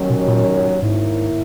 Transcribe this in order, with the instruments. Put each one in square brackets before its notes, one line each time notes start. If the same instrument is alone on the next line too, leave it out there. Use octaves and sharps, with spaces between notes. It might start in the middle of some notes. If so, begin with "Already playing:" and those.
Already playing: [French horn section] D#2 D#3 F#3 C#4
[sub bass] B2
A#2
[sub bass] G#2 [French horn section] D#3 A#3 E4